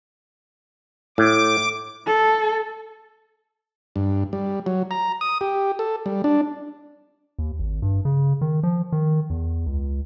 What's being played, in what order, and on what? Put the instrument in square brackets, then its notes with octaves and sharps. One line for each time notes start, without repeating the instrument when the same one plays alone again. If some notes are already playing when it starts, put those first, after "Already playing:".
[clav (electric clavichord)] A2 [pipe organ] D6
[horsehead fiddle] A4
[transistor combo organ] G2
G3
F#3
A#5
D#6
G4
A4
G3
D4
[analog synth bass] D#2
G#1
G2
C#3
D#3
F3
D#3
E2
C#2